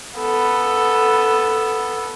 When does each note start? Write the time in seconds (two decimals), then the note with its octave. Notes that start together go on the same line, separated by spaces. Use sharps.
0.19 B3 A4